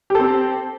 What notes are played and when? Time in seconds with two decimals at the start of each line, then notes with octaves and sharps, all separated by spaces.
0.10 G4
0.15 A4
0.20 C4